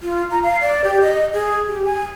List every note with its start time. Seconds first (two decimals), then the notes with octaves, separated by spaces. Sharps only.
0.01 F4
0.31 A#5
0.43 F5
0.61 D5
0.84 G4
1.01 D#5
1.33 G#4
1.68 G4
1.85 G#5